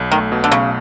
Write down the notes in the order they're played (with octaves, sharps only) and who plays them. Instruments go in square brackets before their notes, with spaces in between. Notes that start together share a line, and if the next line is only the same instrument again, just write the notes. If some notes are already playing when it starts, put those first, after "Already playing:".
Already playing: [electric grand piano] B1
[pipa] D#3 [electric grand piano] A3
[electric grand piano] B2
[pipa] D3
[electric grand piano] B1 [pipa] C#3